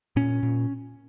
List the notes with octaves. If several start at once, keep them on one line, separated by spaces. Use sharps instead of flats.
A#2 C#4
A#2